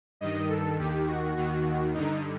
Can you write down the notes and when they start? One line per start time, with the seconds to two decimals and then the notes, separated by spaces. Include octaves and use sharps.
0.21 G2 D#3 D#5
0.49 A4
0.78 D#2 D#3 G4
1.07 F#4
1.37 D#2 D#3
1.94 G2 D3 D#4